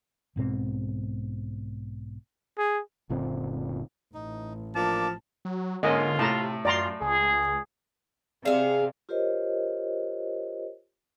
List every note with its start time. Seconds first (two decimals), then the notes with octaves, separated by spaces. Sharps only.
0.36 B1 G#2 B2 C4
2.58 G#4
3.09 F#1 A#2 D3 C4
4.14 A1 D#4
4.75 F3 A#3 D4 A5 D6
5.45 F#3
5.83 G#2 D3 A#3 C#4 F4 D#5
6.19 A2 C3 A3 A5 A#5
6.65 F#2 F4 D5 A#5 C6
7.01 C#2 G#4
8.45 C3 G#4 D5 E5 F5
9.09 F4 G4 A#4 C5 C#5 D#5